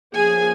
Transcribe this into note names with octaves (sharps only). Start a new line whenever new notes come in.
F3 A#3 C#4 G#4 G#5